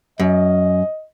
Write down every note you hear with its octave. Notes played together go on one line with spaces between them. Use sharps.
F#2 D#5